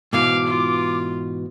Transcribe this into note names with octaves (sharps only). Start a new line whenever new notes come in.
G#2 B2 E3 F5 D6
F4